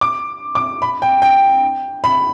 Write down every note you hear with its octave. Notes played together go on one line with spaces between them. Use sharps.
D6
D6
B5
G5
G5
B5